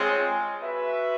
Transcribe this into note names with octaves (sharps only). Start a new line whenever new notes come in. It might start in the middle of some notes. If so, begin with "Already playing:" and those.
Already playing: G#3 C4 F4 G#4 C#5
F#4 B4 E5